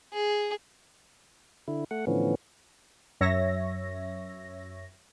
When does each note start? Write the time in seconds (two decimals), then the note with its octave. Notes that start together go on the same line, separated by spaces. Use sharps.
0.13 G#4
1.68 D3 E4
1.91 A3 F#5
2.07 A2 D3 E3 F3 B3 C#4
3.21 F#2 C#5 E5 A#6